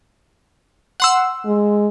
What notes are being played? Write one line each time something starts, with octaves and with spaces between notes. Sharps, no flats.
F#5 C6 E6
G#3